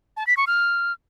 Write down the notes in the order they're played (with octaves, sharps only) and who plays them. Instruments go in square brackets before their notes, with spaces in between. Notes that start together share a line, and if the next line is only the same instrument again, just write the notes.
[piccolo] A5
B6
C#6
F6